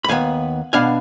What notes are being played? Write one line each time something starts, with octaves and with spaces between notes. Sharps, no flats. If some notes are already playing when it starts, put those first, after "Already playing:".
B5
D#2 D#3 B3 F5 G#5
B2 B3 D4 F5 G#5